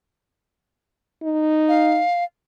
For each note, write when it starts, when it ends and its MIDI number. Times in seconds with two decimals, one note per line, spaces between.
1.23 2.02 63
1.69 2.24 77